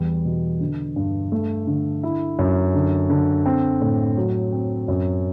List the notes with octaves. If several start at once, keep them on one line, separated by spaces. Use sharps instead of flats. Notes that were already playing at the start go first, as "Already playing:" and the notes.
Already playing: E2 G3
B2
D3
G2
A3
D3
E4
F#2
D3
D3
C4
A2
F#3
C4
F#2